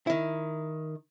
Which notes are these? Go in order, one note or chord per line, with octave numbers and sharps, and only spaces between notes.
D#3 E4